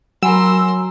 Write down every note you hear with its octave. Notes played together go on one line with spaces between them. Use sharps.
F#3 A#4 F#5 G#5 B5 C6 E6